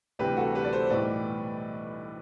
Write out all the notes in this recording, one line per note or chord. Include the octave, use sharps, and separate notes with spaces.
D2 C3 E3 G3 G4 B4
F#4 A4
G4 B4
D5
A4 C5
B1 A2 E3 G3 B4 D5